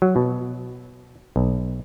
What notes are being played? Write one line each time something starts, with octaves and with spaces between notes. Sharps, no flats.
F#3
B2
B1